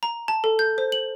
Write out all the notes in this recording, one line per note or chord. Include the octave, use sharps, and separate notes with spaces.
A#5
A5
A4
G6
C5
F#7